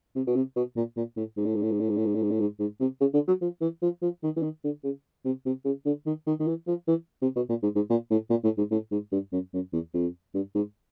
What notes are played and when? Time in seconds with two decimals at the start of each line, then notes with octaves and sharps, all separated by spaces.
0.16 C3
0.27 B2
0.35 C3
0.56 B2
0.76 A#2
0.96 A#2
1.17 A2
1.37 G#2
1.45 A2
1.55 G#2
1.62 A2
1.72 G#2
1.80 A2
1.89 G#2
1.97 A2
2.06 G#2
2.15 A2
2.23 G#2
2.31 A2
2.40 G#2
2.60 G#2
2.80 C3
3.01 C#3
3.14 D3
3.28 F#3
3.41 F3
3.61 E3
3.82 F3
4.02 F3
4.23 D#3
4.36 E3
4.43 D#3
4.64 D3
4.84 C#3
5.25 C3
5.45 C3
5.65 C#3
5.86 D3
6.06 D#3
6.27 D#3
6.40 D#3
6.48 E3
6.67 F3
6.88 E3
7.22 C3
7.36 B2
7.49 A#2
7.63 G#2
7.76 G#2
7.90 A#2
8.11 A2
8.30 A#2
8.44 A2
8.58 G#2
8.71 A2
8.91 G#2
9.12 G2
9.32 F#2
9.53 F#2
9.73 E2
9.94 F2
10.34 G2
10.55 G#2